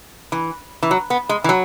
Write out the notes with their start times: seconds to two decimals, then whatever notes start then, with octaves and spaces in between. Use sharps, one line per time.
0.32 E3
0.83 E3
0.91 F#3
1.10 B3
1.29 G#3
1.44 E3
1.49 F#3